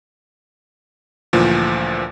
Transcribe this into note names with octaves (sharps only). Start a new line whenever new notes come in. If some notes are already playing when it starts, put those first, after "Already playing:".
D2 A#2 E3 F3